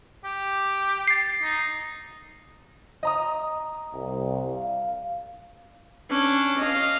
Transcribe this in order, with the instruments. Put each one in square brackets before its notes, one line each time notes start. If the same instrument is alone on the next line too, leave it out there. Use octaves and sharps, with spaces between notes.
[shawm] G4
[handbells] A6 C7
[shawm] D#4
[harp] D#5 A#5 D#6
[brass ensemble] C2
F5
[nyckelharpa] C#4 D4
D#5 F5